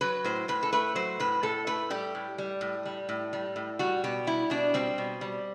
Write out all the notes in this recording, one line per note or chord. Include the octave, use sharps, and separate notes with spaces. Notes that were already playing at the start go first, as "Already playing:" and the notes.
F#3 B4
A2 C5
A2 B4
A4
A3 B4
F#3 C5
A2 B4
A2 A4
A3 B4
G3 G4
A2
G3
A2
G3
A2
G3
A2
G3 F#4
B2 G4
G3 E4
B2 D4
G3 C4
B2
G3